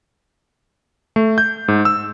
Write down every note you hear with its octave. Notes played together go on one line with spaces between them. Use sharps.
A3
G6
G#2
E6